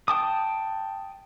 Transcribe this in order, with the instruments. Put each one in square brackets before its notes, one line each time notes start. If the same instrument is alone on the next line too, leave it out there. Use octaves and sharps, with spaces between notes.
[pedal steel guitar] G5 A5 D#6